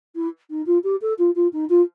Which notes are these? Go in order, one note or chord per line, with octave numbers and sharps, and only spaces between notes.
E4
D#4
F4
G4
A4
F4
F4
D#4
F4